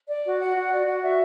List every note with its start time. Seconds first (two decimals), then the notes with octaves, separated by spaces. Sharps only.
0.09 D5
0.26 F#4
0.40 F#5
0.55 F#4
0.72 D5
0.87 F#4
1.02 E5